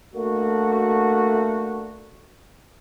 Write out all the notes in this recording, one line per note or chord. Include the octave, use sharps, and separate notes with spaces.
A3 A#3 D4 F#4